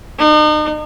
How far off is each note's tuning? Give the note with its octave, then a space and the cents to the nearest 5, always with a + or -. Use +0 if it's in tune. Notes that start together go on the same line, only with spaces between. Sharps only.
D#4 -40